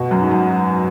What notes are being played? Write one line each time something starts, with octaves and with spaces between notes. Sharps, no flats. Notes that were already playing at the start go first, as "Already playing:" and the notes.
Already playing: B2
F#2
G#2
F#2